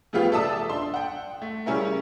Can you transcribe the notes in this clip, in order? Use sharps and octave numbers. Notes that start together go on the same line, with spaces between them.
C#3 F3 A3 B3 F4 G4
A4 D5 E5 A5 D#6 E6
D4 C6
F#5 G5
A3
C#3 G3 C#4 E4 A#4